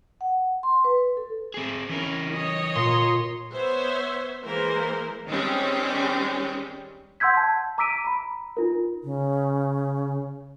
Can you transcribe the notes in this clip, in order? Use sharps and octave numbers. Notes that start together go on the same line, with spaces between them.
F#5
C6
B4
A4
C4 G#4
E3 C#4 E4 A#4
C#5 D#5
A#2 C6
B3 C5 C#5 E5
E3 G#3 A#3 A#4 C5
D#3 G3 G#3 C4 C#4
F#5 C6 E6 G6 G#6 B6
A5
A#5 D6 E6 B6 D7 D#7
A#5 B5
D#4 F4 A#4
C#3